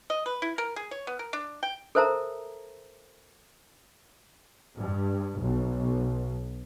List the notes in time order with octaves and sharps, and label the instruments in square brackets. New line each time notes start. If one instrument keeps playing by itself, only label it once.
[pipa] D#5
B4
E4
A#4
G#4
C#5
B3
A#4
D4
G5
[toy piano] A4 A#4 C5 E5 A5 A#5
[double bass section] G2
B1